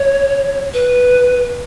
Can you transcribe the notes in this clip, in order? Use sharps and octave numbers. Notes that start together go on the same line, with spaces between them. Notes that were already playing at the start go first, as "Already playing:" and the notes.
Already playing: C#5
B4